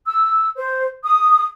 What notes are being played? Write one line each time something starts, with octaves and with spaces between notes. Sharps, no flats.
E6
C5
D#6